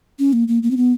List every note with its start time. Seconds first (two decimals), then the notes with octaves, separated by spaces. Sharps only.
0.19 C#4
0.33 A#3
0.48 A#3
0.63 A#3
0.71 C4
0.77 B3